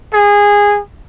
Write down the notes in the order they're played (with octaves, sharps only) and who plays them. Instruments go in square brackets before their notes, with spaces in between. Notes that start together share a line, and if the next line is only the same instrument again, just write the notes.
[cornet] G#4